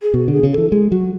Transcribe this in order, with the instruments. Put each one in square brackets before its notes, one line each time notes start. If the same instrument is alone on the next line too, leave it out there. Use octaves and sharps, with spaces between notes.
[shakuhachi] G#4
[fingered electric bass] B2 [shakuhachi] F#4
[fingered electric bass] D3 [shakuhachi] G#4
[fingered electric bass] C#3
[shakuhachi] A4
[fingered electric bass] E3
[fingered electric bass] G#3 [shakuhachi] G#4
[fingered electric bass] F#3 [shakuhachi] F#4